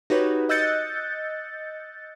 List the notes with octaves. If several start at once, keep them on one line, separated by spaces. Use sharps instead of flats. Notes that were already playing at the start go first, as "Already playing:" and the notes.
D#4 F#4 G4 B4 C#5
D#5 E6 F#6 G6 A6 C#7